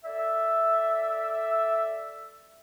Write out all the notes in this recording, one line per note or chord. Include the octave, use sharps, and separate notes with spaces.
A4 D5 E5